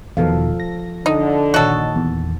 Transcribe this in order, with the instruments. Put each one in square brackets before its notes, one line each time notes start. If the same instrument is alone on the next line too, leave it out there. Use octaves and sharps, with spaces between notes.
[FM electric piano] E2 B2 D#3 [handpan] F3 A4 F5
[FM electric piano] A#6
[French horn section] D3 [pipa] D#4
[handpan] A#2 D#3 [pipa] F#4 A4 [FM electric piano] C#5 D#5
[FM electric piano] E2